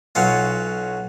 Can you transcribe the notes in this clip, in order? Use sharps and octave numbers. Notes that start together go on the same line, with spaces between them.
B1 F#3 C#4 F4